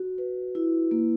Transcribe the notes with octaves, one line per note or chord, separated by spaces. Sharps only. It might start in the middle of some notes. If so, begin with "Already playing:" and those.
Already playing: F#4
B4
E4
A#3